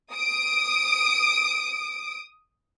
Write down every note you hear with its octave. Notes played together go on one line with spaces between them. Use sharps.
D#6 D7